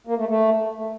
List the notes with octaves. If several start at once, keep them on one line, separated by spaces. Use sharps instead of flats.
A#3
A3
A3